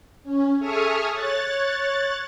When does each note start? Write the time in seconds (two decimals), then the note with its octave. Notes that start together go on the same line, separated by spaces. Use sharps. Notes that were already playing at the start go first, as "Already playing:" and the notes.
0.23 C#4
0.59 G#4 A4 E5 C#6 D#6 F6
1.12 C#5 F#6 A6